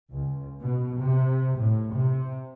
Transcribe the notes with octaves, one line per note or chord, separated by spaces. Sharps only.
C#2
B2
C3
A2
C3